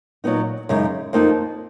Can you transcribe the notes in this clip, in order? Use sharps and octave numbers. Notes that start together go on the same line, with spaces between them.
A#2 F#3 B3 D#4
F#2 C#3 G#3 D#4
F2 F3 A#3 D#4